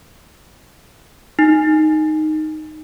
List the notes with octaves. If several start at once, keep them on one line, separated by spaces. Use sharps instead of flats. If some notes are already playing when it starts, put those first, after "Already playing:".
D#4